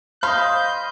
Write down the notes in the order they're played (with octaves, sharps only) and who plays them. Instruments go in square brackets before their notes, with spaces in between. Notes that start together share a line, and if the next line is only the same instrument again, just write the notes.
[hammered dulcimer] C5 D#5 [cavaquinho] F5 [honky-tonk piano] B5 [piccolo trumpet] G6